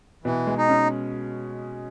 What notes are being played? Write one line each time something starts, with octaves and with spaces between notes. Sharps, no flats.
B2 E3
G#3
D#4
C#4